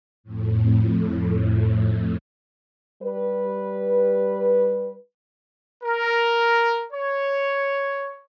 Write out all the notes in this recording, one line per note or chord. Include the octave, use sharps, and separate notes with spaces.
F2 A2
G3 B4
A#4
C#5